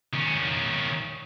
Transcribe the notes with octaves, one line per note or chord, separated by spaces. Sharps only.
D#3 C#4